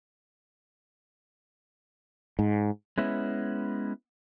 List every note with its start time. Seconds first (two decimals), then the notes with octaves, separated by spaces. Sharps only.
2.39 G#2
2.98 G#3 B3 C#4 E4